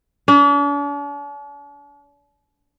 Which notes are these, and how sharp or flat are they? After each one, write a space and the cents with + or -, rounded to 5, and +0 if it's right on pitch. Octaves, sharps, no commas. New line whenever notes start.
D4 -45